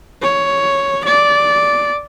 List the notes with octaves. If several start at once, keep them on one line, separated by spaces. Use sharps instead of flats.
C#5
D5